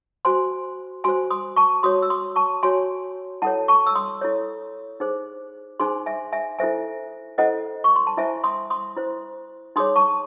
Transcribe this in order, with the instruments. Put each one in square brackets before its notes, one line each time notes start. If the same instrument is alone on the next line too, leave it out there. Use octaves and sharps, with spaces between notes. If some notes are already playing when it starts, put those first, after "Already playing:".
[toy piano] F#4 C5 G#5 C6
F#4 C5 G#5 C6
C6 D#6
A5 C#6
F#4 C#5 C6 D#6
E6
C6 D#6
A5 C#6
F#4 C#5 G#5 C6
E4 A4 C#5 F#5 A5
A5 C#6
E6
C6 D#6
E4 A4 C#5
D#4 G#4 C5
D#4 G#4 C5 G#5 C6
E5 G#5
E5 G#5
E4 A4 C5 E5 G#5
E4 A4 C5 D#5 F#5
C#6
C6
A5
E4 C5 E5 G#5
C6 D#6
C6 D#6
E4 C5
D#4 G#4 C#5 C6 D#6
A5 C#6